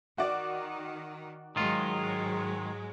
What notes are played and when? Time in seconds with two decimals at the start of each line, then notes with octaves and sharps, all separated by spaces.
0.18 D#3 F#4 D5
1.56 G#2 D#3 F#3 G#3 F4